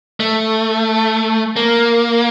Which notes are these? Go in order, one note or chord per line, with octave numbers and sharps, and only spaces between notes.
A3
A#3